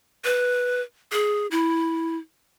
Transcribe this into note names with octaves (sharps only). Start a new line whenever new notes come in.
B4
G#4
E4